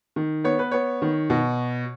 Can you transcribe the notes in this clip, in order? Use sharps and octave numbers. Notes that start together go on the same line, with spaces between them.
D#3
B3 C#5
B4
B3 C#5
D#3
B2